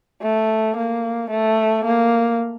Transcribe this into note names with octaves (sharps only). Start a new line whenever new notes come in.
A3
A#3
A3
A#3